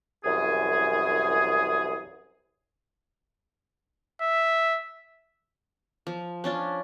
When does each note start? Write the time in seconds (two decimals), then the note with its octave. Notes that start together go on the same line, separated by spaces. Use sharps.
0.24 C2 F#2 E3 G#4
4.22 E5
6.07 F3
6.44 C#4 D4 F4